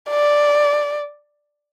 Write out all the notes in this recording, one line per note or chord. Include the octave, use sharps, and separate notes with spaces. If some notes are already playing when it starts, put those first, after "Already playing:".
D5